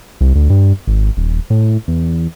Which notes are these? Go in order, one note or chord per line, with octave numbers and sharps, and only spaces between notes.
C2
D2
G2
G#1
D#1
A2
E2